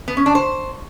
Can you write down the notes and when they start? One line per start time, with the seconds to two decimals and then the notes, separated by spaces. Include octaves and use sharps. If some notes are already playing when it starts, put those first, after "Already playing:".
0.08 B3
0.17 C#4
0.26 D4
0.35 C5